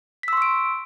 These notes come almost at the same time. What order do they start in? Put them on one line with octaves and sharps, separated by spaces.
B6 E6 C6 C#6 D7